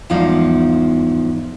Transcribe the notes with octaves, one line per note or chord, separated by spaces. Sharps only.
E2 G#2 F3 G3 D#4 F5